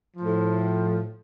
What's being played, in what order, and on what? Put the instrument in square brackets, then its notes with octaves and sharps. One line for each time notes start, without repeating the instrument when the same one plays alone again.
[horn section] A2 F3